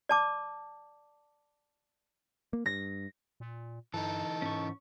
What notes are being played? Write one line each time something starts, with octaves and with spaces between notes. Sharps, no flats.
D5 A5 D6
A#3
G2 A#6
A#2
G2 E3 D#4 A4
G#2 C#4 C#6